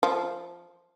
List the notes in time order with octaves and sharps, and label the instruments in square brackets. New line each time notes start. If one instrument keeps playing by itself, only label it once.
[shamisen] F3